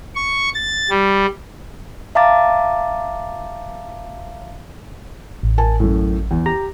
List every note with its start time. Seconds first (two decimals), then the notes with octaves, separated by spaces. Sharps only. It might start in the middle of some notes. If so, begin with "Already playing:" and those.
0.16 C#6
0.54 A6
0.90 G3
2.15 E5 F5 A5 A#5 D6 A6
5.43 A1
5.58 A#4 G#5 A5
5.80 F#2 A2
6.31 E2
6.46 G4 A#5